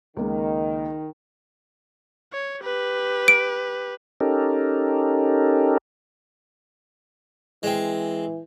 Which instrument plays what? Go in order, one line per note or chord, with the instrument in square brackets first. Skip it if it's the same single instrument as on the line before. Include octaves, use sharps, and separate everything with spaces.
[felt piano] C#2 A#3 [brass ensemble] D#3
[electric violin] C#5
G4 B4
[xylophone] D7
[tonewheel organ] C#4 D#4 G4 A4 A#4
[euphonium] E3 [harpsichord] G#3 C4